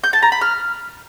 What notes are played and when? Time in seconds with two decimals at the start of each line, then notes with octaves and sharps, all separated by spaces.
0.04 G6
0.13 A5
0.22 A#5
0.32 B5
0.41 F6